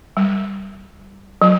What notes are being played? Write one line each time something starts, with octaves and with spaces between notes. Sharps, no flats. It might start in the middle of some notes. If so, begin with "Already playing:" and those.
G3
F#3